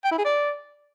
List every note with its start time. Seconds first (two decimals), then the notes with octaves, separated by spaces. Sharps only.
0.04 G5
0.11 E4
0.18 G#4
0.25 D5